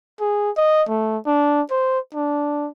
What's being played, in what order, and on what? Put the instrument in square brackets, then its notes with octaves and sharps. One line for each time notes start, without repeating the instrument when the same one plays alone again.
[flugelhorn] G#4
D#5
A3
D4
C5
D4